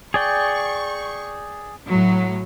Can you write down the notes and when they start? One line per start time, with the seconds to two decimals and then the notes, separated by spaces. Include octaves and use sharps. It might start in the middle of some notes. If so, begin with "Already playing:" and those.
0.14 G#4 D5 G5 C#6
1.88 A2 F#3